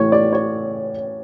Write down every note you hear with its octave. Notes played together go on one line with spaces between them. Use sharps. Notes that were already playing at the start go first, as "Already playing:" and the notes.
Already playing: A2 E3 C#5
D5
C#5